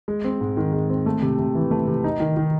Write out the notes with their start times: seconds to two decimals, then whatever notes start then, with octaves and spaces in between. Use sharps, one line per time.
0.08 G#3
0.24 C4
0.41 G#2
0.57 D#3
0.73 G#3
0.90 C4
1.06 A3
1.22 C3
1.39 C3
1.55 E3
1.71 A3
1.87 C3
2.04 D#4
2.20 D#3
2.37 D#3